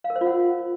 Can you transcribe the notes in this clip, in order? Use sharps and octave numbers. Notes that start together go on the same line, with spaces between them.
F5
A#4
C5
F4
F#5